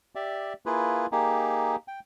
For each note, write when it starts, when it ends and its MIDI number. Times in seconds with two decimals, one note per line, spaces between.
0.15 0.53 67
0.15 0.53 74
0.15 0.53 76
0.66 1.06 58
0.66 1.06 64
0.66 1.06 65
0.66 1.06 68
0.66 1.06 71
1.12 1.76 58
1.12 1.76 63
1.12 1.76 67
1.12 1.76 68
1.88 2.00 79